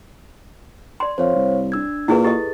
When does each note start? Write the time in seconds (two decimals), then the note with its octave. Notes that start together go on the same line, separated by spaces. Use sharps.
1.00 D5 C6
1.18 F2 C5 C#5 F5
1.36 C2
1.72 D4 E6 G#6
2.08 A#2 E4 G#4 B4
2.25 G4 A4 D#5 A6